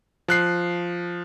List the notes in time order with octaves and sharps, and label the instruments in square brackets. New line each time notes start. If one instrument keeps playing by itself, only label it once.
[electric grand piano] F3 F#6 C7